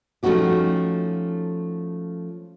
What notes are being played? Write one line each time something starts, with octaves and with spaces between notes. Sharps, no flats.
F3 A3 C#4 D#4 F#4 G4